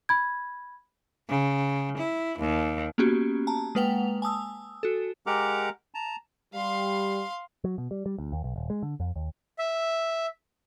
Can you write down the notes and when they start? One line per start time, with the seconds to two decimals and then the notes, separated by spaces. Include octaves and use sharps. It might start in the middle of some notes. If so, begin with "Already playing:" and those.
0.09 B5 G#6
1.29 C#3
1.97 E4
2.39 D#2
2.98 A#3 B3 C#4 F#4 G4
3.47 A5 A#5
3.75 G#3 A#3 B4 F#5 G5 F7
4.22 G#5 A5 D#6 E6
4.83 F#4 A4
5.26 G#3 G4 A#4 F#5 A#5 D6
5.94 A5 A#5
6.54 G3 F5 C6
7.64 F#3
7.78 B2
7.91 G3
8.06 G3
8.18 D2
8.32 D#2
8.44 B1
8.56 D#1
8.70 G#3
8.83 D3
9.00 F2
9.16 D#2
9.59 E5